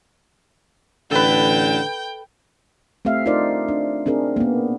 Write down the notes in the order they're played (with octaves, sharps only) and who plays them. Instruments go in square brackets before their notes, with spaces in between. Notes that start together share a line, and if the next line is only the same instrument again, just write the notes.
[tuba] A1 [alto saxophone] D3 [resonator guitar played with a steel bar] A4 B4 [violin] G5
[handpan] A3 C4 G4 E5 F5
D4 D#4 F4 A#4 C5 D5
D4
C4 D4 G#4 A#4
A#3 B3